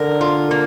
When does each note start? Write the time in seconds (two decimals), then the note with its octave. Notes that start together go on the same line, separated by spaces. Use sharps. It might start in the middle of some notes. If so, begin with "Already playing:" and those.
Already playing: D3 A#4
0.21 F4
0.51 A#3